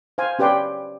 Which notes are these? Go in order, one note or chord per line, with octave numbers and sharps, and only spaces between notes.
C5 F5 G#5
C#4 G4 B4 D5 G5 C6